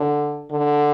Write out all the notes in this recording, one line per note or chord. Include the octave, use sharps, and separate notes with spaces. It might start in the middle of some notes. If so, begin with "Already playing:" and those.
Already playing: D3
D3